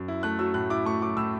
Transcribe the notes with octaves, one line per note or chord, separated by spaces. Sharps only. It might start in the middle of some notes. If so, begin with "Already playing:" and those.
Already playing: F#2
E4
A3 F#6
F#3 E6
A2 F#6
E4 D6
A3 C#6
F#3 D6
A2 E6